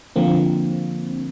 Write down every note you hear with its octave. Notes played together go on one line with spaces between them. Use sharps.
D3 F3 A#3 C4